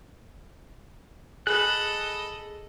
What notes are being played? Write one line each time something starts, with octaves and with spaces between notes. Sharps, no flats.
G#4 A4 D#5 B5 F#6